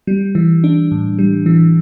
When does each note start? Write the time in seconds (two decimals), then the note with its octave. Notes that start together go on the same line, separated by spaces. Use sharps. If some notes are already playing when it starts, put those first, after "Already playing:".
0.07 G3
0.35 E3
0.64 D4
0.92 A2
1.19 G3
1.46 E3